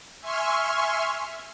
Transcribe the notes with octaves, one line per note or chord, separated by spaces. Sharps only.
E5 G#5 C6 C#6 F6